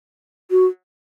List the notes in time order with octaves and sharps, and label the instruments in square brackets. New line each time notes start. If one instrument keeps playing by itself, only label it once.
[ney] F#4